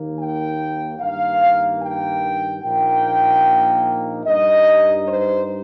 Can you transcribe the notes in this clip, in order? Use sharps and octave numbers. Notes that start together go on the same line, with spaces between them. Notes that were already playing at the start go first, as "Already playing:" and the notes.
Already playing: D#2 D#3 A#3
G5
G2 D#3 A#3 F5
G5
A#1 A#2 A#3 D#4 G5
G2 G3 D#4 D#5
C5